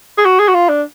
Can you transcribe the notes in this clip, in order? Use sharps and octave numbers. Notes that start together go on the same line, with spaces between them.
G#4
F#4
G#4
F#4
F4
D4